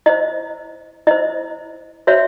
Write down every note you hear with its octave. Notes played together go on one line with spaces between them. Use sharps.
E4 C5 D#5
E4 C5 D#5
F#4 C5 C#5 E5